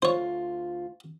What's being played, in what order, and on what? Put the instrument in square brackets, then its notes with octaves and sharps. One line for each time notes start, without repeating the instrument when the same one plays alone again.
[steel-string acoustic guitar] D2 F4 [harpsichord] C5 C#5